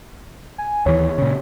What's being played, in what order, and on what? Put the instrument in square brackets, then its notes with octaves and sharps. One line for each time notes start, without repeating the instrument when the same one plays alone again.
[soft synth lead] G#5
[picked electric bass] D#2 E3 [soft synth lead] C#5
[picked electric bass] A#2 C#3